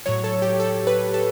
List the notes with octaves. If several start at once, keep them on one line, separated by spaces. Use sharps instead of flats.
A2 F#3 C#5
A4
G4
A4
B4
A4